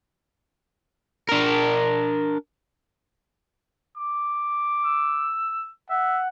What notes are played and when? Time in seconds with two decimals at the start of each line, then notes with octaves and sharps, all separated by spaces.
1.29 D4 A#4
3.97 D6
4.84 E6
5.90 E5 F#5